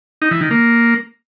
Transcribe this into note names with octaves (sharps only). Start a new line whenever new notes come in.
D#4
E3
D#3
A#3